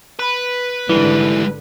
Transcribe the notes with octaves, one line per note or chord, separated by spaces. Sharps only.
B4
G#1 D3 E3 G3 G#3